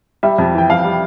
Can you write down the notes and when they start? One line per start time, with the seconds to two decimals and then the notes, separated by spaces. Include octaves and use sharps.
0.23 G3 E5
0.38 F2
0.55 E3 G5
0.70 F2 F5
0.84 G3